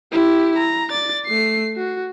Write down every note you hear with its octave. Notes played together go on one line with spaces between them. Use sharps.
E4 G4
A#5
D5 A6
A3 C7
F#4